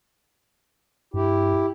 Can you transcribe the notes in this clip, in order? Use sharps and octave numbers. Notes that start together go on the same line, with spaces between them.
G2 E4 G4